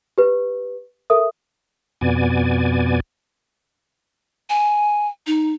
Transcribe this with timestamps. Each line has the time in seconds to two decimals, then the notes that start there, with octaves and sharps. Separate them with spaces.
0.18 G4 B4
1.10 A4 A#4 E5 D#6
2.01 F2 B2 B3 D5 G#5
4.50 G#5
5.27 D#4